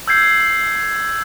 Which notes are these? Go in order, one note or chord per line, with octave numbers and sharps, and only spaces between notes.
E6 G6 G#6 C7